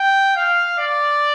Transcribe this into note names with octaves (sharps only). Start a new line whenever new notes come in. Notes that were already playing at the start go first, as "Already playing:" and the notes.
Already playing: G5
F5
D5